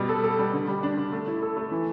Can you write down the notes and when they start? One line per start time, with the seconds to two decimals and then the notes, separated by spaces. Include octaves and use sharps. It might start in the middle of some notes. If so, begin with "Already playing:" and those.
Already playing: B2 G3
0.09 A4
0.24 A4
0.39 G3
0.53 D3
0.68 G3
0.83 D4
0.97 D3
1.12 A3
1.27 E4
1.42 A4
1.57 A3
1.71 E3